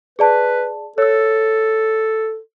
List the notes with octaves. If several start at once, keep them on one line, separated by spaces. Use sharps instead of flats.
G#4 B4 D5 A5
A4 C#5 E6